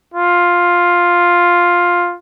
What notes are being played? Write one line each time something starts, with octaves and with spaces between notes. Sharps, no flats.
F4